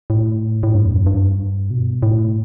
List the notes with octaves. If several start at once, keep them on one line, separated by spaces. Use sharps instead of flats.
A2
A2
G2
E2
F#2
G2
B2
A2